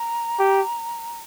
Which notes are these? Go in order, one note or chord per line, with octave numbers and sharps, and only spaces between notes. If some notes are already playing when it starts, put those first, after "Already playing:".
Already playing: A#5
G4